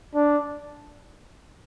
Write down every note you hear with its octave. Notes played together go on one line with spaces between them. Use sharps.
D4